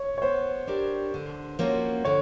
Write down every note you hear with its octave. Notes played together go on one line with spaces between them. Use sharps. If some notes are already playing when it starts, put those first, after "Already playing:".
Already playing: C#5
C#5
B3 C5
D4 G4 A#4 D5
D3
F3 A#3 C#4 F#4
D3 C#5